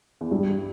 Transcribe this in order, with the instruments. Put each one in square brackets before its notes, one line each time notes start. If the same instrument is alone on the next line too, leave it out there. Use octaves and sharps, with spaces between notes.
[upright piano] E2
[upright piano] G2 [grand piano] G3